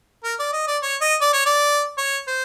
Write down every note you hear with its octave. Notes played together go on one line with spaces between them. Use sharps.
A#4
D5
D#5
D5
C#5
D#5
D5
C#5
D5
C#5
C5